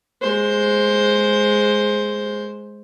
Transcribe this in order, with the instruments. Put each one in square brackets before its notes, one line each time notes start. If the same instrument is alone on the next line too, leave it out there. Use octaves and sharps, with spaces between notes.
[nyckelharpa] G#3 C5